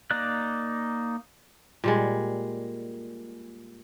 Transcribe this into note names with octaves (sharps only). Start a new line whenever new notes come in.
A#3 D#4 D5 F#6
A#2 G3 G#3